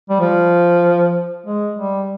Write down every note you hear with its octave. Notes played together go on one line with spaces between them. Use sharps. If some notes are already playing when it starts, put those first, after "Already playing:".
G3
F3
G#3
G3